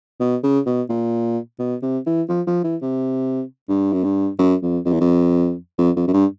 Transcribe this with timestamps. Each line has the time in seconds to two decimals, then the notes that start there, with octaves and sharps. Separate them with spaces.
0.20 B2
0.43 C#3
0.66 B2
0.89 A#2
1.59 B2
1.82 C3
2.06 E3
2.29 F3
2.47 F3
2.64 E3
2.82 C3
3.69 G2
3.93 F#2
4.04 G2
4.39 F#2
4.62 F2
4.85 F2
4.93 E2
5.00 F2
5.78 F2
5.96 F2
6.07 F#2
6.13 G2